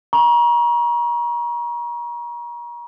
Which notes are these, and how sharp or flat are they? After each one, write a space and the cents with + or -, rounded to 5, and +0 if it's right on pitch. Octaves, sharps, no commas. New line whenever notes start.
A#5 +35 C#6 +0